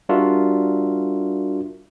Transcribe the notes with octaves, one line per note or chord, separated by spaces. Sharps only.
G3 D4 F4 F#4 A#4 E5